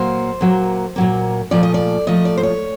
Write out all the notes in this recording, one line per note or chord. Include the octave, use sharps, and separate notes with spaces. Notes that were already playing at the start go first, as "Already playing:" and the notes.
Already playing: A#2 F#3 A#3 C5
A#2 F#3 A#3
A#2 F#3 A#3
A#2 F3 A3 D5
D#5
D5
A#2 F3 A3 D#5
D5
C5
C#5